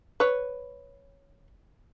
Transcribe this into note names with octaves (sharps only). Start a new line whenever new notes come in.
B4 C#5